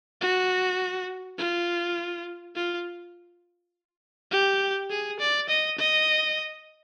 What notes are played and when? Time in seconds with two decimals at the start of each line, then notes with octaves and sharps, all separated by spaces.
0.21 F#4
1.38 F4
2.56 F4
4.32 G4
4.90 G#4
5.20 D5
5.49 D#5
5.78 D#5